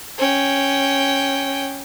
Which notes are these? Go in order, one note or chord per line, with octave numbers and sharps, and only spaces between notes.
C#4 G5